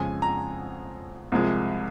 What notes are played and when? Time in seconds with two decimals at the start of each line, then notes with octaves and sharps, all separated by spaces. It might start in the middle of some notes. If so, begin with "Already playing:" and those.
Already playing: F2 C#3 G#3 G#5
0.22 A#5
1.32 C2 C3 F3 G#3